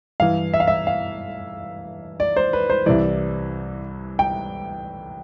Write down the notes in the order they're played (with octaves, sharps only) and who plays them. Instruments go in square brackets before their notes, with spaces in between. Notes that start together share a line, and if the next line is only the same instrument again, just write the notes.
[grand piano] G2 E3 F5
E5
F5
E5
F5
D5
C5
B4
C5
C2 C3 E3 D5
G5